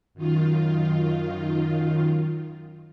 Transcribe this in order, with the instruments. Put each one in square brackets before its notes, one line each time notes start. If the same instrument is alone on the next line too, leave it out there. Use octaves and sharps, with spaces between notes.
[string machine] F#2 D#3 F4